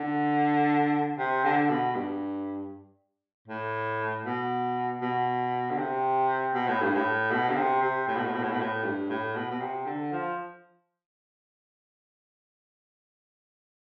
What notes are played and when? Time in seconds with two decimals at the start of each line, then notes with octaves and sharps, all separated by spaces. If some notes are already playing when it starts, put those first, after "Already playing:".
Already playing: D3
1.18 C3
1.44 D3
1.70 B2
1.95 G2
3.48 A2
4.25 B2
5.01 B2
5.71 D3
5.78 C3
6.54 B2
6.68 A2
6.82 G2
6.96 A2
7.31 B2
7.50 D3
7.57 C3
7.82 C3
8.08 A2
8.16 B2
8.26 A2
8.34 B2
8.43 A2
8.52 B2
8.61 A2
8.84 G2
9.10 A2
9.36 B2
9.51 B2
9.61 C3
9.87 D3
10.12 F3